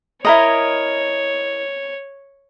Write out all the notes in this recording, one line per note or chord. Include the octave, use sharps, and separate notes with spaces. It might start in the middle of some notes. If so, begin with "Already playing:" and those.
E4 A#4 C#5 D#5